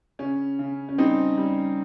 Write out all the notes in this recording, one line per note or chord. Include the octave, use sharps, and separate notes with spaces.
C#3 C#4
C#3
C#4
G3 C4 D#4
G3